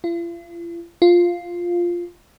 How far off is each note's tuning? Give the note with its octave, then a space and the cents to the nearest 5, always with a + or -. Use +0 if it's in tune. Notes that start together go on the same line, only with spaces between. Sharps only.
F4 -45
F4 +0